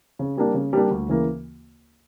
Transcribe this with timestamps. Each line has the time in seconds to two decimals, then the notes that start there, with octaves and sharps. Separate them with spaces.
0.19 C#3
0.37 G3 A#3 D4
0.54 C#3
0.73 G3 A#3 D4
0.91 D2
1.08 C#3 E3 A#3